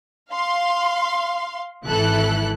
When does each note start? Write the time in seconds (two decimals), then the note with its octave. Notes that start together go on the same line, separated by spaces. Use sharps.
0.32 F5 C6
1.86 G#1 E3 E4 A4 F#6